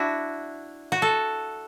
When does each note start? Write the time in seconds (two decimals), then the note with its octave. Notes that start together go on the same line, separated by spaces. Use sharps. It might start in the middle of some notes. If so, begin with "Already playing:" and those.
Already playing: D4 E4 F#4
0.92 F#4
1.02 A4